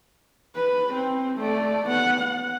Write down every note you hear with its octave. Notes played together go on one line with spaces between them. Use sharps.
B4
C4
A3 D5
B3 F#5
F#5